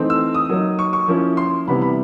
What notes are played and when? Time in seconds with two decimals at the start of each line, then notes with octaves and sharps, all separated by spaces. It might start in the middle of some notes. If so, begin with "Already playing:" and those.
Already playing: E3 A3 C4 D#4
0.10 E6
0.34 D#6
0.49 F#3 A#3 D#4
0.79 C#6
0.93 C#6
1.08 F3 A#3 C#4 E4
1.37 C6
1.68 C3 E3 G3 B3 E4 B5
1.82 B5